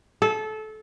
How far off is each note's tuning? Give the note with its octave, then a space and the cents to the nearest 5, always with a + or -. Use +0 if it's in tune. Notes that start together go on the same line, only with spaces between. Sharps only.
A4 -25